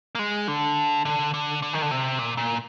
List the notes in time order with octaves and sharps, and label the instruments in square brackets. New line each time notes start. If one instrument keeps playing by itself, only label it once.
[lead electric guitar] A#3
G#3
D3
D3
D3
D3
D#3
D3
C3
A#2
A#2